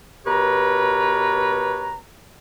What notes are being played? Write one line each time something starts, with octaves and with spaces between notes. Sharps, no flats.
B2 G4 A#4 B4 C#5 A#5